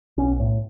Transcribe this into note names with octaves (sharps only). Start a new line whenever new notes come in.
B1 C#4
A2